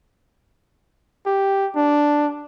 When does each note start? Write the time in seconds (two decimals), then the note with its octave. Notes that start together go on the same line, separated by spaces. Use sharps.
1.26 G4
1.76 D4